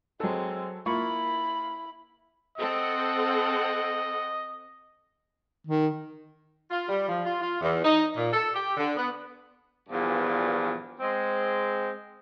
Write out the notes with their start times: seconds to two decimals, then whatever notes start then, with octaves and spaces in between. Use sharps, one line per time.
0.20 F#3 G#3 C4 A4
0.86 A#3 E4 F4 B5 C#6
2.58 C4 A4 D#5 F#5
5.67 D#3
6.71 F4
6.88 G3
7.09 F3
7.25 F4
7.42 F4
7.61 E2
7.84 D#4
8.17 A#2
8.33 A4
8.54 G4
8.77 D3
8.97 B3
9.89 E2 G2 A#2 F3
11.01 G#3 C4